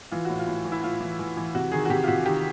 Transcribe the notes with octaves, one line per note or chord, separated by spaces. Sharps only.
E3 F4
A2 F#4
F4
A2
E3
E4
A2 F4
E3
E3
E3
C3 F#4
D#3 G#4
F#4
C3 G4
F4
C3 F#4
D#3 G4